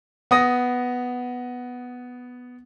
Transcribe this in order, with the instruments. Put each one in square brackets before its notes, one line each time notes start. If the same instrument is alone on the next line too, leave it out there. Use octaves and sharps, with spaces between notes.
[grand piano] B3 D#6 A#6